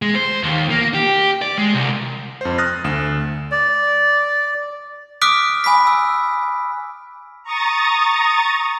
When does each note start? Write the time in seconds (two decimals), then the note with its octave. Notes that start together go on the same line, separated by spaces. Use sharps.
0.02 G#3
0.15 C5
0.43 D#2
0.70 A#3
0.94 G4
1.42 D5
1.58 G#3
1.75 C2
2.41 F2 C5
2.58 D#6 F6 F#6 A6 A#6
2.84 D2 E7
3.52 D5
5.22 D6 D#6 F6 F#6 B6 D7
5.64 G#5 B5 D#6 B6
5.87 E6
7.43 A#5 C#6 D#6 A6